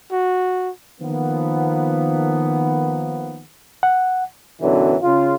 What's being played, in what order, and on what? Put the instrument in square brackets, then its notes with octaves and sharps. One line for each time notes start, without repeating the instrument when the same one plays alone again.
[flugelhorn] F#4
[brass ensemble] D#3 F3 A#3 B3
[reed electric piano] F#5
[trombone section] F#2 B2 D3 E3 F#3
C#3 F4